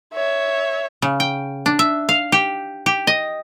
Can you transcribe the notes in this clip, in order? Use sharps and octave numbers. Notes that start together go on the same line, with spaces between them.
C#5 E5
C#3
G5
D4
E5
F5
G4
G4
D#5